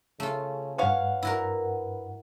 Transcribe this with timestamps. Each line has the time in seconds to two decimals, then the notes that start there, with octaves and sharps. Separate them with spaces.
0.20 C#3 A3 F4
0.78 G2 C#4 B4 C#5 F5 F#5
1.23 E4 F#4 A#4